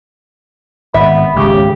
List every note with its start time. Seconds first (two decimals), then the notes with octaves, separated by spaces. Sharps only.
0.94 G#1 B3 E5
1.36 G#1 C#2 C#3 G4